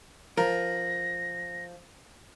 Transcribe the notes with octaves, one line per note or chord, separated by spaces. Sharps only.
F3 A#4 A#6